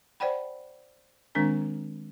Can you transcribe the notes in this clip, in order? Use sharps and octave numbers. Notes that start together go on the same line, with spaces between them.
C5 D5 F#5 G5 B5
D#3 G#3 C4 D4 A#4 A#5